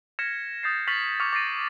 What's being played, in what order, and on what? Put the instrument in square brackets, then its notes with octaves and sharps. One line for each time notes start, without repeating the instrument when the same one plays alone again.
[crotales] F6 G#6 A#6 B6 C#7 E7
D#6 G6 A6 C7
C#6 F6 A6 B6 F7 F#7
C#6 D6 F6 A6 C#7 F7
D6 A6 A#6 C7 D7 D#7